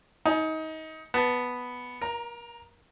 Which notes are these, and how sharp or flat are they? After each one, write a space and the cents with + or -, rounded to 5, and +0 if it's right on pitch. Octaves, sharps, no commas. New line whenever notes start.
D#4 +25 G#5 +35
B3 +0 A5 +0
A#4 +30 A#5 +0